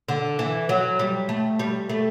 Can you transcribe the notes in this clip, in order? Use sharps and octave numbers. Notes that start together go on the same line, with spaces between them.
D3
E3
F#3
G3
A3
G3
A3